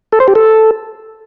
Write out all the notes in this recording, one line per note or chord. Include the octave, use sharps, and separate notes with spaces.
A4
C5
G4
A4